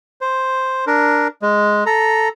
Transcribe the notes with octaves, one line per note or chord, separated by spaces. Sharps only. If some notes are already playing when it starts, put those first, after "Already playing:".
C5
D4 A#4
G#3
A4 A#5